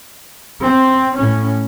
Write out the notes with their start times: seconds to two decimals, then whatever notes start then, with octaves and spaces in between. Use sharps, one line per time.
0.63 C4
1.17 A2 C#4